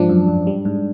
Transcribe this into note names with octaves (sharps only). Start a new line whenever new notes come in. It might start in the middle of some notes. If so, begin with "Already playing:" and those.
Already playing: G#2 F3 D4
F#2
F#2
G3
G#2